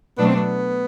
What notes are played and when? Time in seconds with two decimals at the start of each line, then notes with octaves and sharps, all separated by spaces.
0.18 B2 F#3 A3 B3 D4
0.27 C4
0.37 B3